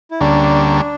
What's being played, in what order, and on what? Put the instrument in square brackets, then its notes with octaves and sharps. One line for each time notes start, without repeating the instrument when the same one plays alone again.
[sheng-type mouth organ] E4
[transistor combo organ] D2 D3 G3 A#3 C#4 [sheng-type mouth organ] D4